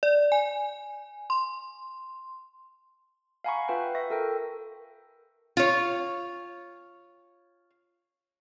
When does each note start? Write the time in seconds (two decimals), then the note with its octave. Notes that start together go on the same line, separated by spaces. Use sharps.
0.03 D5
0.32 G#5
1.30 C6
3.44 F5 F#5 G#5 A#5 B5 C#6
3.68 F4 B4 E5 G5
3.95 E5 C#6 A#6
4.10 A4 A#4 G5
5.57 F4 C#5